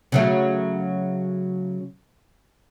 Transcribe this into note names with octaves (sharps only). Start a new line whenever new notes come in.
C#3 F#3 A3